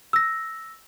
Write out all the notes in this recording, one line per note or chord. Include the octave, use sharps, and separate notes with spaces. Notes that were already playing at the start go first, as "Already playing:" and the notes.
E6 A#6